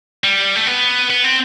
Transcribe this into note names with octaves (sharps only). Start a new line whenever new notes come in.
G3
A3
B3
B3
C4